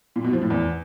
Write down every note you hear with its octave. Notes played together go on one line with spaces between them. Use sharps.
A#2
B2
F3
A2
E2